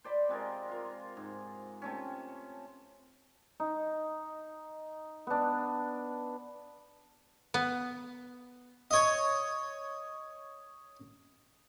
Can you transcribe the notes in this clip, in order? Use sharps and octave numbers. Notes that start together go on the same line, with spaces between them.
C5 D5 B5
C3 G#3 F4 A#4
F4 A#4
G#2
C3 A3 C#4
D#4
B3 D4
B3
C#5 D#5